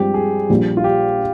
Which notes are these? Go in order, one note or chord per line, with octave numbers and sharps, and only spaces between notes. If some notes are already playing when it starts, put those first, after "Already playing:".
Already playing: G2 F3 G#3 C4 G4
G#4
A#1 A#2 G3
F4
G4